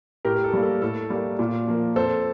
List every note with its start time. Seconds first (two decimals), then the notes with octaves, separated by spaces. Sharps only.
0.25 A2 G4 A#4
0.35 G4
0.44 A4
0.53 G3 A#3
0.63 A4
0.82 A2 A4
1.10 G3 A#3
1.39 A#2
1.68 F3 A#3
1.96 F2 A4 C5